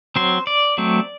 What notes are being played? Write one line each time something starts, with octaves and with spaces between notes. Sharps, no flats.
F#3 C4 C5
D5
F#3 A3 C4